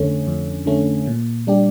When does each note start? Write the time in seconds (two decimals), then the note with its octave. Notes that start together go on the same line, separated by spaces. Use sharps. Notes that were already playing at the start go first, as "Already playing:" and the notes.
Already playing: F2 D3 A3 C#4
0.27 F2
0.66 D3 A3 C#4
1.07 A#2
1.47 G3 D4 G4